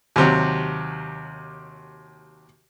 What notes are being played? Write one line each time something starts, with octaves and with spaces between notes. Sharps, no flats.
D#2 C3 F#3